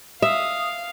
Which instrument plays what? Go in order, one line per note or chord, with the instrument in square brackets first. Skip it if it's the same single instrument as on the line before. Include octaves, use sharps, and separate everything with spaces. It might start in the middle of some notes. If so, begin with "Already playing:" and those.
[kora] E5 [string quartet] F5 [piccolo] D#6